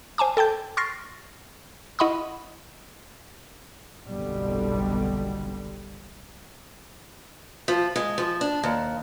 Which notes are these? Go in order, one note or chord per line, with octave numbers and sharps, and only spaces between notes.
C5 G#5 A5 D6
A4 G5 A5 G6
C6 C#6 F6 A6 A#6 C7
E4 D#5 F#5 B5 C#6 D#6
F#1 B1 B2 D3 G3
F3
G#3
F3
D4
D#2